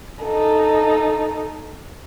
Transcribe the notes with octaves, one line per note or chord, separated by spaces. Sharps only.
D#4 A4